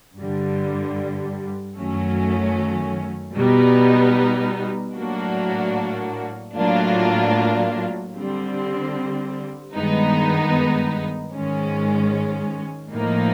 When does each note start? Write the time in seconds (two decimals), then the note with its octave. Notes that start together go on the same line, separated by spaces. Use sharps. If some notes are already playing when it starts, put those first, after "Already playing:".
0.18 G2 D3 G3
1.78 F#2 D#3 F#3 A3 C#4
3.36 B2 G3 B3 D#4
4.96 A2 F#3 A#3 D4 F#4
6.56 A2 F#3 A#3 D4 F4
8.15 D3 G3 C4
9.74 G2 D#3 G#3 B3 D#4
11.34 G#2 D#3 G#3 C#4
12.93 A2 F3 A#3 D#4